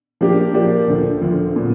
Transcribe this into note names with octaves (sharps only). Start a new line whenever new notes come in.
F3 A#3 D4 G4 A#4
F3 A#3 D4 G4 A#4
D2 D3 F3
D2 D3 F3
A#2 F#3 B3